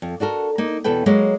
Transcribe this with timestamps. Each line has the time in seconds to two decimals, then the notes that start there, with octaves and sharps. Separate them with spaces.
0.02 F2
0.20 D4 F#4 A4 A#4
0.58 A#3 D#4
0.84 E2 B2 A4 B4 G5
1.06 F#3 G#3 A#3 A#4 B4 C#5